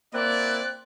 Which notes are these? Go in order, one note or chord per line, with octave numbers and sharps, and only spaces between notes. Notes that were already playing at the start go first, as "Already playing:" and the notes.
A#3 C4 E4 D5 F#6